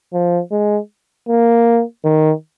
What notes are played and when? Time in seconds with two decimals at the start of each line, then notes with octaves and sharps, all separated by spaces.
0.13 F3
0.51 G#3
1.28 A#3
2.05 D#3